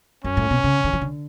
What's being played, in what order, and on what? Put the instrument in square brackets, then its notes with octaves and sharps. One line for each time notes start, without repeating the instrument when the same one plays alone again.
[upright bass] F#2 [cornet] C#4
[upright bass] A2
B2
C#3
D3
E3
D3